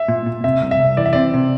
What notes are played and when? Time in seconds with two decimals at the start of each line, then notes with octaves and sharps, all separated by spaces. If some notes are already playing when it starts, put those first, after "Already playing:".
Already playing: E5
0.08 A#2
0.26 A#2
0.44 C3 E5
0.62 C2
0.71 E5
0.80 C2
0.97 E3 D5
1.06 E5
1.13 C4 D5
1.34 C3